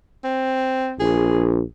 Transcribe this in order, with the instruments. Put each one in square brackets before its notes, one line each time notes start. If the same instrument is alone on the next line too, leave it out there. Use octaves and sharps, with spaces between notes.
[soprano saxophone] C4
[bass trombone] A#1 [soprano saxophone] G#4